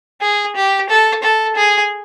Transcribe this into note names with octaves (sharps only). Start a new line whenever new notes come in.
G#4
G4
A4
A4
G#4